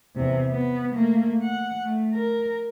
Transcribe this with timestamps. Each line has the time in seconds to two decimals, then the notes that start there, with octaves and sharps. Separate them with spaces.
0.16 E2 C3
0.50 B3
0.94 A3 A#3
1.42 F#5
1.85 A3
2.14 A#4